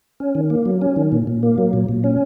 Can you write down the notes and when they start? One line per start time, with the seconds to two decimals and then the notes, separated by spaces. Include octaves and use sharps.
0.20 C#4
0.35 D#3
0.50 A#3
0.66 F#3
0.82 C#4
0.96 D#3
1.12 A#2
1.27 A#2
1.43 A#3
1.58 F#3
1.73 A#2
1.89 A#2
2.04 C#4